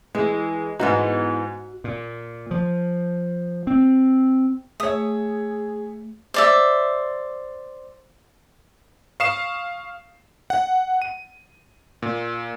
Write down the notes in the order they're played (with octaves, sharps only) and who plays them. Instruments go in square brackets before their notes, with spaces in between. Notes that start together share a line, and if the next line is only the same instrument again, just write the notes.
[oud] E3 [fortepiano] G#3
[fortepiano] G#2 D#4 [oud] E3 G#3 B3 [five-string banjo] F#4
[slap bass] A#2
F3
C4
[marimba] A3 [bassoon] G#4 [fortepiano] C#5 E5 [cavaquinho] D#6
[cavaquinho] C5 D5 E5
[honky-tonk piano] F5 C#6 D#6 C7 E7
[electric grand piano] F#5
D#7
A#2